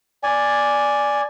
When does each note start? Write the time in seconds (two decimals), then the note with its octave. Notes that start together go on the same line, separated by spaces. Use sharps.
0.23 D5 G#5